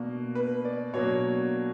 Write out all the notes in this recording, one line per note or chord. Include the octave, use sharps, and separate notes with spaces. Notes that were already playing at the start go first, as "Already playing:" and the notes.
Already playing: B2 A#3 D4
B4
D5
B2 F#3 A#3 D4 C#5